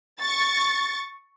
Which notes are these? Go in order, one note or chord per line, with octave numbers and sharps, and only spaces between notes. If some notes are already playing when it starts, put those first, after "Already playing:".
C#6 A6